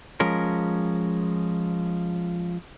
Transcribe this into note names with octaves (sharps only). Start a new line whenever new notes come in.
F3 G#3 C#4 A#4